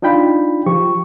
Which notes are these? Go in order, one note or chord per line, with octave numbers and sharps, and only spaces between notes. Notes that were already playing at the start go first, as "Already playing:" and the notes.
D4 D#4 F4 G5 B5
F3 G4 C#6